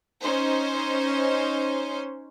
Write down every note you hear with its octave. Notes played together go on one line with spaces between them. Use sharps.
C#4 D#4 C5